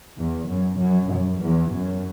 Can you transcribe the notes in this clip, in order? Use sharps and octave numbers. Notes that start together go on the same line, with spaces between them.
E2
F#2
F#2
F#2
E2
F#2